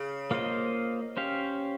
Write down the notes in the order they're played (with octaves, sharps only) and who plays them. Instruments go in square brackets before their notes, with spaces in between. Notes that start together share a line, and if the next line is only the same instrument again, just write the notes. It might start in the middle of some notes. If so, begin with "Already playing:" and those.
Already playing: [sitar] C#3
[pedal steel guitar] A#3 F4 C5 D#5
C#4 G4 C5 F5